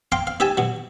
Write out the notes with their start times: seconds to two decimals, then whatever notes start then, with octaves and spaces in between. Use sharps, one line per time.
0.12 F5 G5 A#5 C6 D6
0.27 F5
0.40 D#4 G4 E5 G#5 A5
0.57 B2 F#3